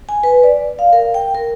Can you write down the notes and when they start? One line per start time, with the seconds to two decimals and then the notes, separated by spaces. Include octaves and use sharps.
0.09 G#5
0.23 B4
0.43 D5
0.79 F5
0.93 A#4
1.14 G5
1.35 A#4